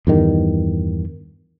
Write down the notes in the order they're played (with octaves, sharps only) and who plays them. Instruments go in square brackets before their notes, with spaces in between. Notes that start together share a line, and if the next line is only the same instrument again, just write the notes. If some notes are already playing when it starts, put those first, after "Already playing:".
[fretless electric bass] E2 G2 D#3